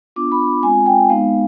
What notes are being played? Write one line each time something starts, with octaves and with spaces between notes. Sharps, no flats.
B3 D4 F4 D6
B5
G#3 C4 F4 G#5
G5
G#3 B3 D#4 F5